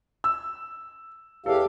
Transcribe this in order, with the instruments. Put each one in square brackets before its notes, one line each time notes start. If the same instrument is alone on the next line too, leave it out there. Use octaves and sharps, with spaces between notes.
[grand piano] E6
[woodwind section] E2 [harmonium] G4 F5 [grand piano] A4